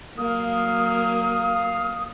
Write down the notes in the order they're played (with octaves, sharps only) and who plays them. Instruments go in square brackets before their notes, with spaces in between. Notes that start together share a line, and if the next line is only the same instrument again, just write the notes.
[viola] F#3 A#3 [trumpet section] F5 [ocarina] D#6